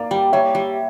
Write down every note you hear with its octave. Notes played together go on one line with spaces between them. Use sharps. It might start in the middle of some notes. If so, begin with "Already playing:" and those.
Already playing: A#3 D5
G3
G3 C#5 E5
G3